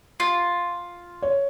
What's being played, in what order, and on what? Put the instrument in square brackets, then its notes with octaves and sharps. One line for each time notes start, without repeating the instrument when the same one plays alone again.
[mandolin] F4
[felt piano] C#5